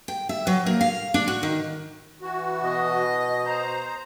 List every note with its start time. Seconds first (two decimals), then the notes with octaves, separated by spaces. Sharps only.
0.08 G5
0.29 E5
0.47 F#3
0.66 A#3
0.81 F5
1.14 D4
1.28 F#4
1.43 D#3
2.22 E3 F#4
2.64 B2 D#5
3.45 C5 A#5